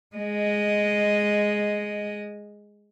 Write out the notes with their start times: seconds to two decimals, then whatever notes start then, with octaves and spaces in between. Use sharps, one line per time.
0.16 G#3 D#5